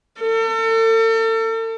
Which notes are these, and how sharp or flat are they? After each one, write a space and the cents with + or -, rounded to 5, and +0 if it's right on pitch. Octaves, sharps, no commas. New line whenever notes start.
A4 +40